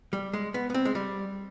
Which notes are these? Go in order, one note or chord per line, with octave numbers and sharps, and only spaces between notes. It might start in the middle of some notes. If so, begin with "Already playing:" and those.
G3
G#3
B3
B3
C4
G#3
G3